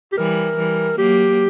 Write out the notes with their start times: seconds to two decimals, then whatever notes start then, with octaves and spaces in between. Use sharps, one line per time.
0.12 G4
0.17 E3 G3 A#4
0.57 E3 G3
0.98 F#3 A#3 G4